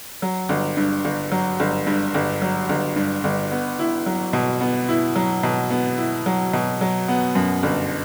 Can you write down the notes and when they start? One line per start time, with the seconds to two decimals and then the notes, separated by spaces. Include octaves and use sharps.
0.22 F#3
0.49 G1
0.77 G2
1.05 G1
1.32 F#3
1.60 G1
1.87 G2
2.14 G1
2.42 F#3
2.69 G1
2.96 G2
3.24 G1
3.52 B3
3.79 E4
4.06 F#3
4.33 B2
4.61 B3
4.89 E4
5.16 F#3
5.43 B2
5.71 B3
5.98 E4
6.26 F#3
6.53 B2
6.81 F#3
7.08 B3
7.35 F#2
7.63 G1